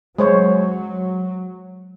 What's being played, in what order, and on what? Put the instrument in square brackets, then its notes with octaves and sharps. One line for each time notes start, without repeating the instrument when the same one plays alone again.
[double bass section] F#3 [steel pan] G#3 C5 C#5